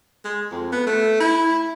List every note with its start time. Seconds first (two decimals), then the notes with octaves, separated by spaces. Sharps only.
0.24 G#3
0.51 F2
0.72 B3
0.87 A3
1.20 E4